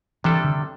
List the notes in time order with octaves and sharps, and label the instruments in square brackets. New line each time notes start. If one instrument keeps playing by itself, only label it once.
[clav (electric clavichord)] C3 G3 D4 A4 [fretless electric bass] E3
[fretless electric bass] D3